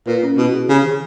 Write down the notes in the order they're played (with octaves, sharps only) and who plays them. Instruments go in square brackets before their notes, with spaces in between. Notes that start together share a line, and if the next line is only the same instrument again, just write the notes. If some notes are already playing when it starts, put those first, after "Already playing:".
[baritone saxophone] A#2 [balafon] B4
[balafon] C#4
[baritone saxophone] B2 [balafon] E4
[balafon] G#4
[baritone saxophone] C#3 [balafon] G4
[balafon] D#3